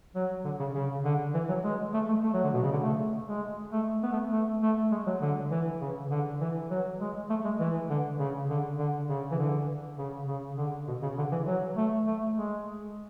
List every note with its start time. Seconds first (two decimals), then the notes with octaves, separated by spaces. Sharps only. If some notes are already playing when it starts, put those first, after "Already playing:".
0.15 F#3
0.45 D3
0.60 C#3
0.75 C#3
1.05 D3
1.34 E3
1.49 F#3
1.64 G#3
1.94 A3
2.09 A3
2.24 A3
2.34 F#3
2.43 D3
2.54 B2
2.63 C#3
2.73 D3
2.83 A3
3.28 G#3
3.72 A3
4.03 B3
4.12 A3
4.32 A3
4.62 A3
4.92 G#3
5.07 F#3
5.22 D3
5.51 E3
5.81 C#3
6.11 D3
6.41 E3
6.70 F#3
7.00 G#3
7.30 A3
7.45 G#3
7.60 E3
7.89 D3
8.19 C#3
8.49 D3
8.79 D3
9.09 C#3
9.31 E3
9.38 D3
9.98 C#3
10.27 C#3
10.57 D3
10.88 B2
11.03 C#3
11.18 D3
11.32 E3
11.47 F#3
11.77 A3
12.07 A3
12.36 G#3